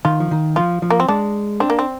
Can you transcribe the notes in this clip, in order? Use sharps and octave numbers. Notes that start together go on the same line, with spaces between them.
D#3 F4
F3
D#3
F3 F4
F3
A#3
C4
G#3 D4
C4 D4
A#3
C4